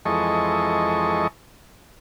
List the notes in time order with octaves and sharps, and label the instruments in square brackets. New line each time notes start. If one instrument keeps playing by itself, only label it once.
[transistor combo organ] F2 E3 G#3 A4 D#5 C#6